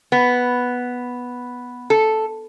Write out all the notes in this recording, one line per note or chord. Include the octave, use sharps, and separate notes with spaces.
B3
A4